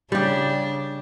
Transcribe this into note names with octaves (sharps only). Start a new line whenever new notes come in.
C#3 G3 D4 G4